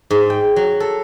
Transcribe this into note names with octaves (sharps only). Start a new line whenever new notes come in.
G#2
G5
F#3
A4